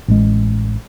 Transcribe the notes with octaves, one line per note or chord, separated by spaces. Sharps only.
A1 G#3